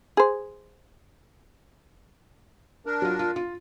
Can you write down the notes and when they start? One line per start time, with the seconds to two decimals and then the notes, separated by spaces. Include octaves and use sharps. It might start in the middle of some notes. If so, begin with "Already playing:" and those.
0.17 G#4 C5
2.86 D4 A#4
3.02 F#3 F4
3.19 F4
3.36 F4